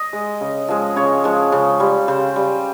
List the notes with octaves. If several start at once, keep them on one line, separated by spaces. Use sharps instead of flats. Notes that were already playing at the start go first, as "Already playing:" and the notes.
Already playing: D#5
G#3
C#3
F3 G#3
C#3 C#5
F3 G#3
C#3
G3
C#3 C5
G3